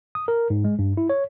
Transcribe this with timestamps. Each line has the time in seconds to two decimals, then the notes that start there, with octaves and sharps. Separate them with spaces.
0.15 D#6
0.28 A#4
0.50 G#2
0.65 G#3
0.79 G2
0.97 E4
1.10 C#5